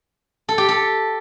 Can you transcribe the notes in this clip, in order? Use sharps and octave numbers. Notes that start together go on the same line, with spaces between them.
A4
G4
A4